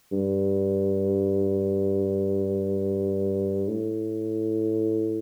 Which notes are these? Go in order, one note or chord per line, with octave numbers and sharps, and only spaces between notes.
G2
A2